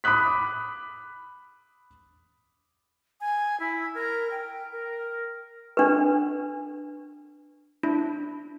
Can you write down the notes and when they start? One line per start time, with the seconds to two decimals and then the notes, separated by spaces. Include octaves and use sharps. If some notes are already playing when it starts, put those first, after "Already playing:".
0.04 B5 D6 D#6 F#6 B6
3.21 G#5
3.60 E4
3.94 A#4
4.31 G5
4.72 A#4
5.77 D4 B4
7.83 D4 E4